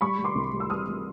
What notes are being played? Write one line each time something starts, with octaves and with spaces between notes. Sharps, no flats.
G3 B5 C#6
G3
C6 D6
C2
G3
E6
G3 D#6 F6
G3